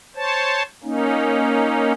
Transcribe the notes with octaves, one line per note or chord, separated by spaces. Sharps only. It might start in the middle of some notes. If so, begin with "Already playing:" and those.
C5 C#5 A5
A#3 C#4 D#4